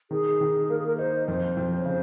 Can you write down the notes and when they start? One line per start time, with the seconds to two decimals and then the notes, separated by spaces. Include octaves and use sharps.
0.11 D#3 G#4
0.41 D#3
0.70 A#3 A#4
0.78 G#4
0.87 A#4
0.98 D#4 C5
1.28 F2 C5
1.57 F2
1.79 C#5
1.85 C#3 C5